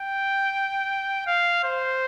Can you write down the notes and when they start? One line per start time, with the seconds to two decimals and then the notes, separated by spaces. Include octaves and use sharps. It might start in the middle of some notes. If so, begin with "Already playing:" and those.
Already playing: G5
1.27 F5
1.64 C5